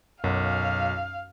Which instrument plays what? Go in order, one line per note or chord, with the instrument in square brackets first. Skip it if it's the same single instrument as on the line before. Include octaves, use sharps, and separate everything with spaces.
[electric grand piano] B1 [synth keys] F#2 [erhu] F5